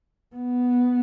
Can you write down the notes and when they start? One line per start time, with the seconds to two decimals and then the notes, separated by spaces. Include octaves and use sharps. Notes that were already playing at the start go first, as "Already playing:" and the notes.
0.35 B3